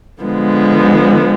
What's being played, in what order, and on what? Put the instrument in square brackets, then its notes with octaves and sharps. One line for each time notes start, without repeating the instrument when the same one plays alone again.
[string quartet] D3 F3 G#3 B3